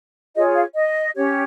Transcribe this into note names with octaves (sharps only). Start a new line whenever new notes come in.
F4 G#4 C#5 D#5
F5
D#5
C#4 G4 C#5